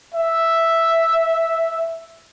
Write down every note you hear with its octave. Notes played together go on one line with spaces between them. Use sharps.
E5